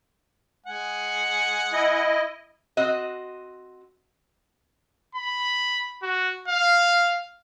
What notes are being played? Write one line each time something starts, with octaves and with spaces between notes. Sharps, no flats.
G#3 F#5 G#5
E4 D#5
C4 F#4 D#5
B5
F#4
F5